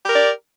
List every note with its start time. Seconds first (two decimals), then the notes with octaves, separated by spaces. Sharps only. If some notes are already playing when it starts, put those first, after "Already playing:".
0.04 G4
0.09 A#4
0.14 D5